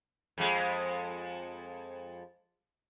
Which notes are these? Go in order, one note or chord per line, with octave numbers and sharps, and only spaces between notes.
F2 G#3